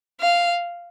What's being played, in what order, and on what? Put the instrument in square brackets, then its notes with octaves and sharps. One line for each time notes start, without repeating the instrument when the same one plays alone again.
[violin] F5